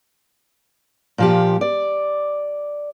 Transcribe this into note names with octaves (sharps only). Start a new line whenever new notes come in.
A#2 F3 G4
D5